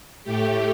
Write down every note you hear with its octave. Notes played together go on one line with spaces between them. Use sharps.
A2 A3 G4